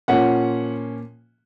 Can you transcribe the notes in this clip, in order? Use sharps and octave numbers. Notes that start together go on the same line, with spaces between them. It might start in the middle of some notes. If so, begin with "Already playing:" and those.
A#2 F3 A#3 C#4 F#5